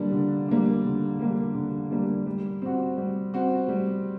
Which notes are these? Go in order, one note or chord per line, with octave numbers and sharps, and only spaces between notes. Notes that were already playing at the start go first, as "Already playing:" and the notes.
Already playing: D3 G3 A#3 D4
D3
G3 A#3 D4
D3
G3 A#3 D4
D3
G3 A#3 D4
G3
C4 F#4
G3
C4 F#4
G3